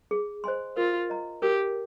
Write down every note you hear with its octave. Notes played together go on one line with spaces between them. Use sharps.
G#4
C5 D#5 G#5 C6
F4 A#4
D#5 A#5
G4 A#4